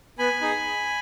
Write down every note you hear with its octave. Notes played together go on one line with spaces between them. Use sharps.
B3 G#5 B5
D#4 G#4